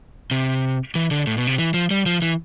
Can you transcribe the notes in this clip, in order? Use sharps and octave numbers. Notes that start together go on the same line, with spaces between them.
C3
E3
D3
A2
B2
C3
E3
F3
G3
F3
E3